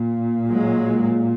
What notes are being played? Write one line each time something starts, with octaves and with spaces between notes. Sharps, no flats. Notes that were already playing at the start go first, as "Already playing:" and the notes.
Already playing: A#2
F#3 G#3